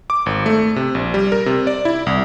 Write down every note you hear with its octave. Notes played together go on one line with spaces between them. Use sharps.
D6
G#1
A3
C3
A#1
G3
A#4
C3
D5
E4
C2